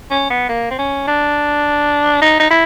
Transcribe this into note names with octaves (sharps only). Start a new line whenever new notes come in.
C#4
B3
A#3
C4
C#4
D4
D#4
D#4
E4